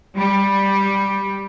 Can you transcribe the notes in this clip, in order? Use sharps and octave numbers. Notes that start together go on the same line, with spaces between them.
G3